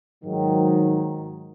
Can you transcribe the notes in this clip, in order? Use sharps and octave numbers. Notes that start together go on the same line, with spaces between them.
G#2 D#3 F#3